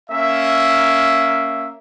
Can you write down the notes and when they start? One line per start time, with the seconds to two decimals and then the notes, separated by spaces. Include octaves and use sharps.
0.10 A#3 C#4 E5